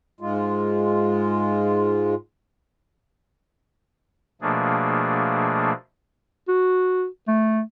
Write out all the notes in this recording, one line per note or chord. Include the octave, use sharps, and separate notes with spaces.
G#2 G#3 F4
B2 F3 A3 A#3 D4 G#4
F#4
A3